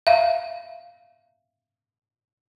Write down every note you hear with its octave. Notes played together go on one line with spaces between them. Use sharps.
E5 F5